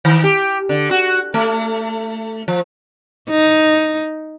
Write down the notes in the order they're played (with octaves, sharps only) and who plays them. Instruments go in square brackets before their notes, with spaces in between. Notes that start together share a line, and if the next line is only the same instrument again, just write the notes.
[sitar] D#3
G4
D3
F#4
A3
F3
[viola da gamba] D#4